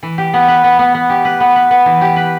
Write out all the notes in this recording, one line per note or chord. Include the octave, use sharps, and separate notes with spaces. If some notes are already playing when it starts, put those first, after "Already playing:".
E3
G4
B3
B4
B3
B3
B3
G4
B4
B3
B4
B3
E3
G4
B4